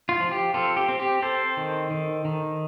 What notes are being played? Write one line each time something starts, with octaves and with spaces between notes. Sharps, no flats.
F4
F3
G4
C4 F4 A4
G4
C4
G4
C4 A4 C5
D#3
D#3
D#3